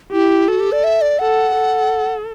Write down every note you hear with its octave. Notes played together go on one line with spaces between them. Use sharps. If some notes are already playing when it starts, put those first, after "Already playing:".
E4 G4
F#4 A4
G4
D5
E5
D5
A4 F#5
A4